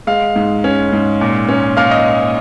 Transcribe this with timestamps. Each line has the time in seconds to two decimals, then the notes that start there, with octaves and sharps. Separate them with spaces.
0.07 G#3 F5
0.36 G#2
0.64 C#4
0.92 G#2
1.21 A#2
1.49 C#4
1.77 A#2 F5 F6
1.91 D#5 D#6